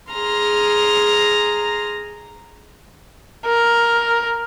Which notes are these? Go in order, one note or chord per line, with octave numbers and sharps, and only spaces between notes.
G#4 A#5 C6 F6
A#4